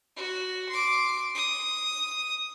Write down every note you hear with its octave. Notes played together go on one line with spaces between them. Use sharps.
F#4
C6 D6
D#6